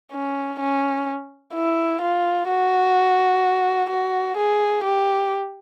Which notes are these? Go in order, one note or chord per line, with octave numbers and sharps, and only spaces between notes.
C#4
C#4
E4
F4
F#4
F#4
G#4
G4